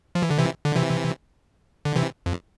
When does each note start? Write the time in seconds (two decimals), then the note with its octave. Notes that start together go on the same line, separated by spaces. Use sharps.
0.15 F3
0.22 E3
0.30 D3
0.39 C3 E3
0.65 D3
0.75 C3 E3
1.85 D3
1.96 C3 E3
2.26 F2